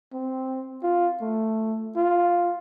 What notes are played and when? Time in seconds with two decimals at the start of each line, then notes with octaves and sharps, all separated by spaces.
0.13 C4
0.83 F4
1.21 A3
1.96 F4